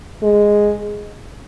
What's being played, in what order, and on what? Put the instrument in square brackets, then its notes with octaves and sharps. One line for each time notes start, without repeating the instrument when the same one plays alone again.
[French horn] G#3